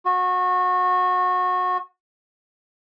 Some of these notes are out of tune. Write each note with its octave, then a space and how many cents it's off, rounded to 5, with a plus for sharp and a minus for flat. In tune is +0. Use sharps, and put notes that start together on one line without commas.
F#4 -25